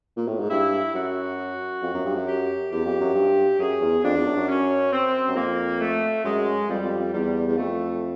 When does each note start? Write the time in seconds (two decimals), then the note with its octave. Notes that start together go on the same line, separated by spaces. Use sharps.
0.17 A#2
0.28 A2
0.39 G#2
0.50 G2 E4
0.94 F#2 F#4
1.82 F2
1.94 F#2
2.05 G2
2.16 F#2
2.27 G4
2.71 E2 G4
2.85 F2
3.00 F#2
3.15 G2
3.59 F#2 G#4
3.81 E2
4.04 F2 D4
4.15 E2
4.25 F#2
4.36 F#2
4.48 C#4
4.92 C4
5.28 F#2
5.36 F2 A#3
5.80 A3
6.24 F#2 G#3
6.68 F2 G3
6.84 F2
6.99 F2
7.13 E2 G3
7.47 E2
7.57 F2 A3